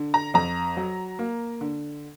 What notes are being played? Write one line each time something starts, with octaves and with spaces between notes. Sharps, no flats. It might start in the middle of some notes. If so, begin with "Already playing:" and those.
Already playing: D3
A#5
F2 A#5
F#3
A#3
D3